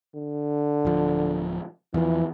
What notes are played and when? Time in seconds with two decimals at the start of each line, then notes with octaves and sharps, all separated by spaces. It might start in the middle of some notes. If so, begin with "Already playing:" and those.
0.14 D3
0.85 D1 F3
1.94 E2 E3 F3